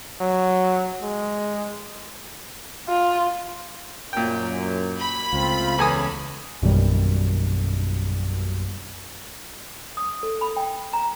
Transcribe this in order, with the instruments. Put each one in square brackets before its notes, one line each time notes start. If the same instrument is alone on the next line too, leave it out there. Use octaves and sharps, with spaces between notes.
[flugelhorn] F#3
G#3
[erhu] F4
[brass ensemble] F#2 [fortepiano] A#2 G5
[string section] B5
[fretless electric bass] C#2 [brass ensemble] A3 C4 F4
[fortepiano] E2 G#5 D#6 [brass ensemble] C#4 A4 B4
[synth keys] A#1 F#2 B2 D#3 G3
[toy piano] D#6
A4
B5
G5
A#5